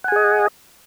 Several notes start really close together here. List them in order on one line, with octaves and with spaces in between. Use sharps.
F#5 G#5 G#4 D#5